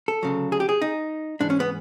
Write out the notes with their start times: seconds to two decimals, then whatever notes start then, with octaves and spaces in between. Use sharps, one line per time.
0.08 A4
0.23 D2 C#3 F#3
0.52 G#4
0.60 G4
0.69 G#4
0.81 D#4
1.40 G#2 E3 D4
1.50 C#4
1.60 B3